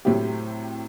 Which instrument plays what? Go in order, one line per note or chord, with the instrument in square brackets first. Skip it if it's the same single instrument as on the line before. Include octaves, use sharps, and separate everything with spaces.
[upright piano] A2 C3 F#3 E4 G4